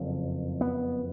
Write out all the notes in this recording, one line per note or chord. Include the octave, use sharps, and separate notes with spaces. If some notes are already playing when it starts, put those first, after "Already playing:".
Already playing: F#1 F2 C#3
B3